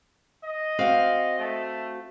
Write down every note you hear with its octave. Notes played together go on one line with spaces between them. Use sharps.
D#5
C4 F#4 F5
A3